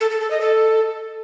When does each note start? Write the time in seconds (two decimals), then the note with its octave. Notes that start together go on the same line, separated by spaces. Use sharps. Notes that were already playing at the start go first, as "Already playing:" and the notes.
0.01 A4
0.11 A4
0.21 A4
0.31 D#5
0.41 A4